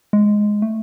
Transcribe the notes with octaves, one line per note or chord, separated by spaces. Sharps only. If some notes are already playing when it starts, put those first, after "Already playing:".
G#3
A3